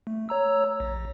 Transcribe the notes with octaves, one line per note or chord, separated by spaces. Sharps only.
A3
C#5 A#5 E6
A#1